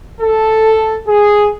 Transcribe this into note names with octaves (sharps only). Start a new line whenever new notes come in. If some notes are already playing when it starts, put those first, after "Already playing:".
A4
G#4